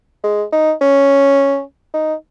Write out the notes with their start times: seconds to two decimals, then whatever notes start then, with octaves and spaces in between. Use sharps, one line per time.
0.24 G#3
0.52 D#4
0.81 C#4
1.94 D#4